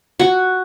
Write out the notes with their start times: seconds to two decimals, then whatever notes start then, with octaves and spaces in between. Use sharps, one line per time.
0.19 F#4